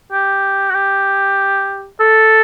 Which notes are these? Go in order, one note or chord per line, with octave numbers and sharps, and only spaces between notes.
G4
F#4
G4
A4